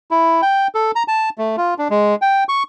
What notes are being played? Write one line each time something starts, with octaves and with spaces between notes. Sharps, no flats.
E4
G5
A4
A#5
A5
A3
F4
D4
G#3
G5
C#6